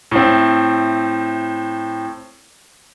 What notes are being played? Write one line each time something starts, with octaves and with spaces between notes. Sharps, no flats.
A2 C4